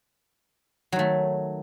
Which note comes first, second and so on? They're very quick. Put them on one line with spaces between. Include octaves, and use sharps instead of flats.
F#3 D#3 A3